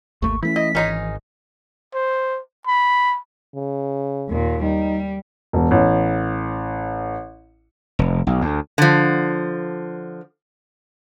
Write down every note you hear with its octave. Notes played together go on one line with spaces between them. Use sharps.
G#1 D#2 A3 A#3 C#6
E3 A3 C#4 E4 B6
E4 D#5
G#1 E3 C#4 D#4 G#4
C5
B5
C#3
D#2 A#2
G3 D#4
E1
A1
F1
B1
D2
D3 F3